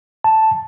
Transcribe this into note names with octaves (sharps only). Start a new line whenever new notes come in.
A5